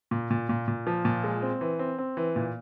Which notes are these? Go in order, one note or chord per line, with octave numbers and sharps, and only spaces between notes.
A#2
A#2
A#2
A#2
F3
A#2
G#3
C4
E3
C4
C4
E3
A#2